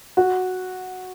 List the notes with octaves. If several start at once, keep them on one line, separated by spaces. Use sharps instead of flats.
F#4